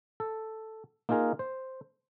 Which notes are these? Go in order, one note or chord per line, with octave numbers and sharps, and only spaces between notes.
A4
A#3 D#4 F4 G#4 A#4
C5